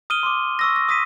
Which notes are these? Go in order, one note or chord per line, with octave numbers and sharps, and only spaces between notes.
D#6 F6 D#7 G7
C6 D6
C#6 E6 A#6
A#6
D#6 A#6 B6 D#7